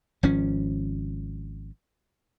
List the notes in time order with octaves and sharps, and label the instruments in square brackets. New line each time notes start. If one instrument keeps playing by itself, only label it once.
[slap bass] G#1 F3 C#4